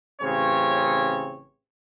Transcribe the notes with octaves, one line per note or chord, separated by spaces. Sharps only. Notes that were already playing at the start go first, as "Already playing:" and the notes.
A1 C#3 C4 C#5